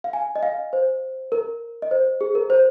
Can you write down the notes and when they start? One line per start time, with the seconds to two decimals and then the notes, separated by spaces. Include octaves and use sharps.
0.04 F5
0.13 G#5
0.36 D#5
0.43 F5
0.73 C5
1.32 A#4
1.82 D#5
1.91 C5
2.21 G#4
2.35 A#4
2.50 C5